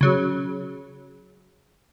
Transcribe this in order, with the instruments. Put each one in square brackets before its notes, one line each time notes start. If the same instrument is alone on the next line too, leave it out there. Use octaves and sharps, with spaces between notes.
[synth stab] C#3 F#3